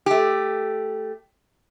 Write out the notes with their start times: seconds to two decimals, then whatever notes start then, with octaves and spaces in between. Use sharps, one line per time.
0.06 A3 G4